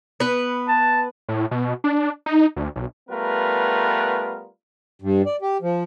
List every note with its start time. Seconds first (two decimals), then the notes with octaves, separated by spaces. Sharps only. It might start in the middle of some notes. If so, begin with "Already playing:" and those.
0.20 B3 B4
0.68 A5
1.29 A2
1.51 B2
1.84 D4
2.26 D#4
2.56 D2
2.76 B1
3.10 G3 A3 B3 F4 A#4 B4
5.02 G2
5.26 D5
5.42 G4
5.62 F3